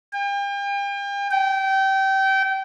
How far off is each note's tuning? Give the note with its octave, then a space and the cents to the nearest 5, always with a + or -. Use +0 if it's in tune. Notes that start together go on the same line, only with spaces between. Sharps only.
G5 +40
G5 -25